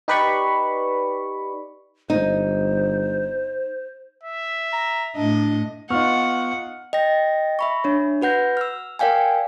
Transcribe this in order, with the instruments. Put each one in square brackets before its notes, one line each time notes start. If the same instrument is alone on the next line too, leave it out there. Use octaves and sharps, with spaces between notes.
[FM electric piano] D#4 G4 B4 D5 B5 C#6
[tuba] G1 [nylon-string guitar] D#4 [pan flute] C5
[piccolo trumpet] E5
[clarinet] A#5
[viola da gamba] A2 D#5 [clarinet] D4
[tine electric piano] B3 C#6 [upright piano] D#4 F4 F6 [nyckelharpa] F#5
[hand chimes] D#5 G5 A#6
E5 B5 C#6
D4 C#5
F#4 B4 F#5 G6 A#6
E6 F6
A#4 D5 F5 G5 G#5